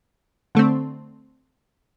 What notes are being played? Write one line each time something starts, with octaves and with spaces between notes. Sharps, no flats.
D3 A3 C4